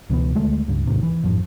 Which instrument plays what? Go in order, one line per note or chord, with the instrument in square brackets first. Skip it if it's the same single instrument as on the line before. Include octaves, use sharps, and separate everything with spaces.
[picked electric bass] C#2 B2 E3 B3
D2 G#3 A3
C#2 G2
A1 D#2 G#2 C3
E3
A1 F2 G#2 F3